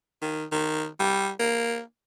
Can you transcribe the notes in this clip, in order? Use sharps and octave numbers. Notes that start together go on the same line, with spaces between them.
D#3
D#3
G3
A#3